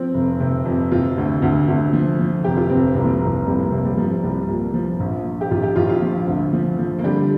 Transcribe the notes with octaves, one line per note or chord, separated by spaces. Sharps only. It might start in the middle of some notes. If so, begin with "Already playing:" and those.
Already playing: F3 C4
F1
C3
F2
C3 F4
D2
D2
D2
F3
F3
F1 G4
F4
F1 C4
C2 G3
F3
C2 F3
C2 G3
A#3
C3 A#3
G3
C2 F3
C2 G3
A#2 A#3
F3
A#1
F3
G4
A#1 F4
G4
A#1 F4
F4
F3
D2
F3
F3
A#3
D3 G3